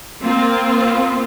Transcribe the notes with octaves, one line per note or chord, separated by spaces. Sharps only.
A#3 C4 F4